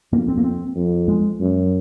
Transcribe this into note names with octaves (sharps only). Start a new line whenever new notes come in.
F2 A#3
C4
A#3
C4
F2
G#3
F#2